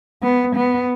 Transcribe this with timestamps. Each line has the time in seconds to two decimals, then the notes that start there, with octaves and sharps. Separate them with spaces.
0.22 B3
0.56 B3